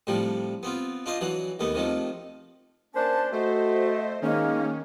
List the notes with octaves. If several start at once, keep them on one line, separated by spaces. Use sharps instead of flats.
A2 C3 F3 G3
B3 C4 F4
D4 F4 C5 D#5
E3 F#3 D4
D#2 A3 B3
C3 D#3 F3 A3
A#3 C#4 D4 C5 A5
A3 F#4 C5 D#5
D#3 G#3 A#3 C#4